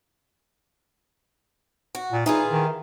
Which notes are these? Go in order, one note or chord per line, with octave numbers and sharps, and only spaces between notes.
F#4
A#2
E3 D#4 F4 G#4
D#3